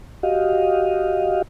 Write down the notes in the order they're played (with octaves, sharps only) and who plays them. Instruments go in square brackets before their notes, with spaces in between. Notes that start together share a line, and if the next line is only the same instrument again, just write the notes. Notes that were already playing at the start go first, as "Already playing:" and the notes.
[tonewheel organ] F#4 G4 D#5 F5